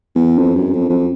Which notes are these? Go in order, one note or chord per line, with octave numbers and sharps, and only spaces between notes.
E2
F2
F#2
F2
F2